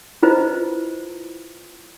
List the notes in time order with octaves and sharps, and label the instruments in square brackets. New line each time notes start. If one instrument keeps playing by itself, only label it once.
[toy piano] E4 F4 B4 C5 D#5